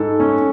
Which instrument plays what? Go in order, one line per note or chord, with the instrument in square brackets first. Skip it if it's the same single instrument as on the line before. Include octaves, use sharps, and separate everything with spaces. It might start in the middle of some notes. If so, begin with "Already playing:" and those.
Already playing: [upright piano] G#2 A4
C#4